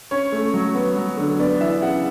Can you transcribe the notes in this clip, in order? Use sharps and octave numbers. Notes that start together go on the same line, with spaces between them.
C#4 C#5
A3
F#3
B3
F#3
D3
B3 D5
E3 E5
C#3 F#5